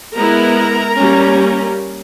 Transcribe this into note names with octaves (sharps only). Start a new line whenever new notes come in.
G#3 B3 E4 A#4 A#5
G3 A#3 C#4